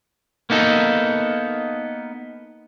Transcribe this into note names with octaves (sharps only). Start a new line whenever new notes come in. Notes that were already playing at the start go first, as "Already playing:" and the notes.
A#3 B3 D#4 A4